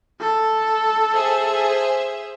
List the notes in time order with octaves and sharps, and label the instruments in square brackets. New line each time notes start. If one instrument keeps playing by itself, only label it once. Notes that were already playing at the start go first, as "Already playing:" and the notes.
[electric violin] A4
[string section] G#4 C5 E5